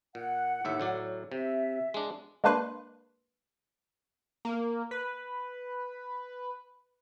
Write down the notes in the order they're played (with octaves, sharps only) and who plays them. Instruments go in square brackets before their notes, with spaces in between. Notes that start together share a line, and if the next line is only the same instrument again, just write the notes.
[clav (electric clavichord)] A#2 [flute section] F#5
[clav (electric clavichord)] D#2 A2 E5
A2 F#3 D5
[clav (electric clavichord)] C3 [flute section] E5
[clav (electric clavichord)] G#3 D4
[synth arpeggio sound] G#3 A#3 D4 B4 C6 F#6
[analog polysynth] A#3
B4